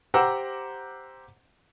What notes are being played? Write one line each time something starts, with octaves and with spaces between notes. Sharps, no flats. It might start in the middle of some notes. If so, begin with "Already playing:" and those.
G4 C5 F#5 A#5 D6 E6